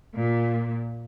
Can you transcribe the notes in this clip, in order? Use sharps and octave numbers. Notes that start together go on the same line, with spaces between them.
A#2